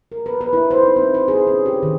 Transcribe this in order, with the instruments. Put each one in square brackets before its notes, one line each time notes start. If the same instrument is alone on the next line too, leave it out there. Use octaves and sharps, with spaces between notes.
[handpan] A#4
B4
B4
E4
C5
D#4
C4
C5
G#4
C#4
G4
D#3